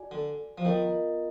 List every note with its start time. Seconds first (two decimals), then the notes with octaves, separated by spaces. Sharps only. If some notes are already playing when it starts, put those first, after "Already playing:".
Already playing: F#4 D5 G#5
0.11 D3
0.58 F3
0.65 D#3 B3 F4 A#4 D#5